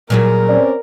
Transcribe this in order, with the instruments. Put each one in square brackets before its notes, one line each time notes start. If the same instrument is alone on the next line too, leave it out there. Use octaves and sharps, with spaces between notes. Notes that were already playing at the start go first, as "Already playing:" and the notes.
[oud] A#2 F#3 G#4 [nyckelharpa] A#4
[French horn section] C4 C#4 D5